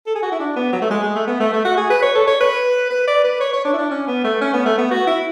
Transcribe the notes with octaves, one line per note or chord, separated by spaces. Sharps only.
A4
G#4
F#4
E4
D4
B3
F#3
A3
G#3
G#3
A3
B3
A3
A3
F#4
G#4
B4
C#5
A4
C#5
B4
B4
D5
B4
C#5
C#5
D4
E4
D4
C#4
B3
A3
C#4
B3
A3
B3
F#4
E4